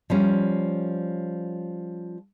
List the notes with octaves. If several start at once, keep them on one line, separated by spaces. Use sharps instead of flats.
F3 G3 C#4